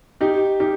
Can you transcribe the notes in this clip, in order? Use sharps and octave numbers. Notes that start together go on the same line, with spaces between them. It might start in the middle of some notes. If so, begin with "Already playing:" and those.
D#4 G4
D#4 G4